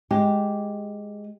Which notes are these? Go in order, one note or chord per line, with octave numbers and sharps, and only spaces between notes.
G#3 G4